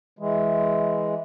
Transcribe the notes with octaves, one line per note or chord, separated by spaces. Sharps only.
E3 G#3